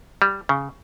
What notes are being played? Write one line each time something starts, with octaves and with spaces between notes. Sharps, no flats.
G3
C#3